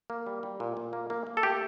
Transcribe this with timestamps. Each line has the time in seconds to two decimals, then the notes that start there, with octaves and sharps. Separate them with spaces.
0.10 A#3
0.26 G3
0.43 G3
0.60 A#2
0.77 A#2
0.93 A#3
1.10 A#3
1.27 A#3
1.37 A4
1.43 A3 G4